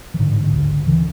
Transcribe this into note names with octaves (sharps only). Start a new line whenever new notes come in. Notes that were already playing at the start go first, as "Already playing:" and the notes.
E3
A1 G#2 D3
D2 C#3
C#3 E3